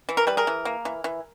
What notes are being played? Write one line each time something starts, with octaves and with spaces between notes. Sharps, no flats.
E3
A#4
G3 B4
G#4 A#4
E3
A#3
E3
E3